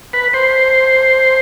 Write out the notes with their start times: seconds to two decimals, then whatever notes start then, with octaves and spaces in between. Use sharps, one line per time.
0.13 B4
0.33 C5